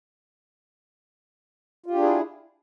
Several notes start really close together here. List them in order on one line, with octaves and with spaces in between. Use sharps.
F4 G4 D4 G#4 E4